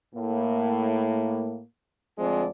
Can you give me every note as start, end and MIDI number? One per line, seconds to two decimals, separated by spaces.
0.15 1.61 45
0.15 1.61 58
2.18 2.47 38
2.18 2.47 53
2.18 2.47 56
2.18 2.47 60
2.18 2.47 74